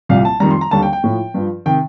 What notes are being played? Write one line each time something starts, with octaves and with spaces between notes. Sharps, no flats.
C2 A#2 G3 F5
A5
F2 D#3 G3 A#5
C6
A#5
D#2 D3 G3 A5
G5
G5
A2 F3
G2 F3
C3 D#3 G5